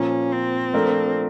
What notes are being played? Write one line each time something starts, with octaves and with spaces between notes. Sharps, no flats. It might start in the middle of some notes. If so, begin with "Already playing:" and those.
Already playing: A#2 F3 A#3 C#4
C4
F3 A3 D4 F4 A#4